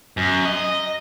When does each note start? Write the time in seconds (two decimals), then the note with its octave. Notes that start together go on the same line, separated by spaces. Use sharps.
0.17 F#2
0.45 D#5